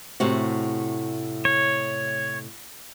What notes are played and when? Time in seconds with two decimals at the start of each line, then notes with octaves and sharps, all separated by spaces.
0.20 A2 C3 F#4
1.45 C#5